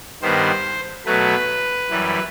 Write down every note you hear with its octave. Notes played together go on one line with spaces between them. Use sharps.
G2 D#3 G3 B3 C5
B2 F#3 A3 B4
F#2 E3 G3